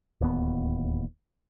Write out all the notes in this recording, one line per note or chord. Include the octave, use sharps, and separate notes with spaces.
D1 D#2 B3